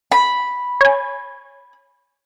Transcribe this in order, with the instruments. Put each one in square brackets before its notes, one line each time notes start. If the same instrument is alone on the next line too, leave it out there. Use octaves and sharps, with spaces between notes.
[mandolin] B5
[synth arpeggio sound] C#5 G#5